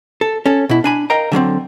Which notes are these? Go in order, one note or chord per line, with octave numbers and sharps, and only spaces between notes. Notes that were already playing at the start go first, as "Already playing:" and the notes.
A4
C#4 A4
B2 E4
D4 G#5 B5
A#4 D#5 F5 G5 A#5
D3 F#3 A3 C4